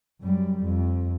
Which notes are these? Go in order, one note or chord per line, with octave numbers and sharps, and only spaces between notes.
F#2 G3
F2